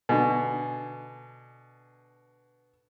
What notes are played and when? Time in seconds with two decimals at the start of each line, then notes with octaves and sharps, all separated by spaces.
0.09 B2 D3 G#5